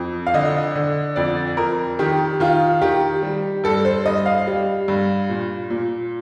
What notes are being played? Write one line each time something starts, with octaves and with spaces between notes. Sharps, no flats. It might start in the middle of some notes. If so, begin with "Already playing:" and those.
Already playing: F2
F5
D3 D#5
D3
F2 D5
F2 A#4
D#3 G4
D#3 F4
D#3 G4
G3
G2 A4
C5
G2 D#5
F5
G3
G2
A#2
A#2